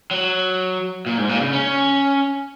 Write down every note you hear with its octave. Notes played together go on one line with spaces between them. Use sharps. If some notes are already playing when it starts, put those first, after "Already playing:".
F#3
A#2
G#2
A#2
C#3
C#4